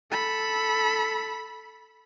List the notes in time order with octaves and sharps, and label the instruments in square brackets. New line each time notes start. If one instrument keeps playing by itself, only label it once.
[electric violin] A4 B5